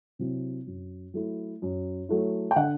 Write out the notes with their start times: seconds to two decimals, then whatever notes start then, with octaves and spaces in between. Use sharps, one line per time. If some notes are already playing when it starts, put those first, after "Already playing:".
0.19 C3 F#3 C4 E4
0.67 F#2
1.14 F#3 A3 E4
1.62 F#2
2.09 F#3 A3 E4
2.51 G5
2.56 D3 F#5